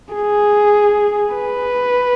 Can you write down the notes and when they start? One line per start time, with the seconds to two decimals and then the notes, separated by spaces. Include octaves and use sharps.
0.15 G#4
1.35 B4